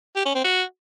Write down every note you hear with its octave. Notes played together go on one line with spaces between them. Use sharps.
G4
C#4
C4
F#4